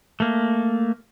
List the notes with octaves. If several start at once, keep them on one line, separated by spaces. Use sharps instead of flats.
A3 A#3